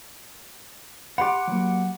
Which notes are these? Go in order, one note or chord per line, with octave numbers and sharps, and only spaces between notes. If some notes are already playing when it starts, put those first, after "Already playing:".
G4 F#5 B5 D6
F#3 A#3